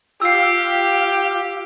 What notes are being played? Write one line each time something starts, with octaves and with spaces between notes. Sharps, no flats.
F4 G4 E6 C7